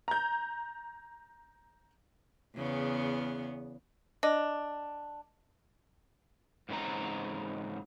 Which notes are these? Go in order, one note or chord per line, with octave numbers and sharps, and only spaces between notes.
A#5 G6
E2 C#3 B3
D4 D#5
G#2 C#3 E3 C4 A#5